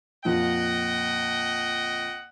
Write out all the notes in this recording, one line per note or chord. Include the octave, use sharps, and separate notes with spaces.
F2 A#2 D#5 F#5 G5